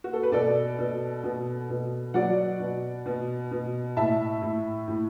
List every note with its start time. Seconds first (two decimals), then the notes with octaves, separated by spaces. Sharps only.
0.04 F#4
0.13 A4
0.23 B4
0.32 B2 A4 D5
0.79 B2
1.24 B2
1.70 B2
2.14 F#3 D5 F#5
2.60 B2
3.06 B2
3.51 B2
3.97 A2 E5 A5
4.42 A2
4.88 A2